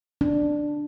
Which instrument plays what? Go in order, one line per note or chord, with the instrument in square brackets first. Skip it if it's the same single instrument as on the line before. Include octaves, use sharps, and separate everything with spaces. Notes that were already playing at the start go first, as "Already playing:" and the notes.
[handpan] D4